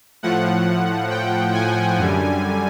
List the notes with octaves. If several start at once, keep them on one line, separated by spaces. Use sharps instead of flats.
A2 F3 F#5
G5
G#5
F#2 D3 G3